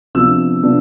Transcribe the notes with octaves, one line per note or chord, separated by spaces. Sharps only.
C3 F3 B3 D4 E6
C3 F3 B3 D4